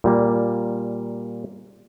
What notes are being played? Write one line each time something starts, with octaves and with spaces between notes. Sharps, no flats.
A#2 G3 A#3